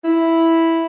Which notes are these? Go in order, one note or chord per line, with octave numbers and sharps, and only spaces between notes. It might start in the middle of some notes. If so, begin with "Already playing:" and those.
E4